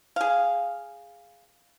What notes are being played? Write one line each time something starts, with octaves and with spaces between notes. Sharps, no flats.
G#4 F5